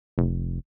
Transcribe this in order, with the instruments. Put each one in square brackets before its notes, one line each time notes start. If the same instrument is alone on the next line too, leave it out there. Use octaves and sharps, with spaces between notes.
[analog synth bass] F1